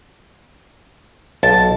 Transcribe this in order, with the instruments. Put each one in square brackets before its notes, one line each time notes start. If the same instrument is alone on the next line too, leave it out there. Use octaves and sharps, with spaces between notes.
[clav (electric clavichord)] B1 [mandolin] A5